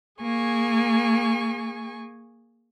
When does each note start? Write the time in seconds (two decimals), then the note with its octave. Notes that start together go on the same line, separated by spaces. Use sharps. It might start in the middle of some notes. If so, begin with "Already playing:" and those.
0.21 A#3 G#4 G#5 C#6